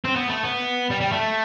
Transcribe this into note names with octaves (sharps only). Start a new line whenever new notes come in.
C4
B3
A3
B3
G3
G3
A3